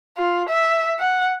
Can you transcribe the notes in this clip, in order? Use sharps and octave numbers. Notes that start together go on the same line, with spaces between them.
F4
E5
F#5